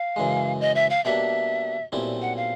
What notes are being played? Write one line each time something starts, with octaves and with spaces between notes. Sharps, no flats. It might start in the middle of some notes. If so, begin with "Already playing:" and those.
Already playing: F5
F#2 C#3 E3 G#3
D#5
E5
F5
B2 G3 A#3 D4 E5
B1 A#2 G3 C4 E4
F#5
F5